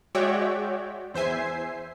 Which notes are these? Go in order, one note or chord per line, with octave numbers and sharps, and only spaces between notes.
G#3 F#4 C#5 D5 E5 G5
E2 C5 E5 G#5 C7